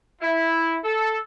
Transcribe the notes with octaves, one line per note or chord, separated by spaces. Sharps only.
E4
A4